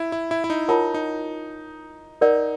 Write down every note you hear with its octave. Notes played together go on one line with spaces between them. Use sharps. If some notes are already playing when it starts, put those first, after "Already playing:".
Already playing: E4
E4
E4
E4
D#4
D#4 F4 A#4 C#5 F#5 A5
D#4
D#4 A#4 D5 F#5